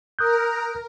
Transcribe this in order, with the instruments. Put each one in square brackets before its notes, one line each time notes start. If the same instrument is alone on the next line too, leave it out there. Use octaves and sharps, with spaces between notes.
[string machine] A#4 [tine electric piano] D#6 F#6 G6